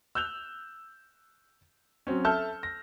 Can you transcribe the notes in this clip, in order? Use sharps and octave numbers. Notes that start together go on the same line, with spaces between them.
E6 F#6 G6 F7
F#3 C4 C#4
A4 E5 A5 E6 F6 G6
A#6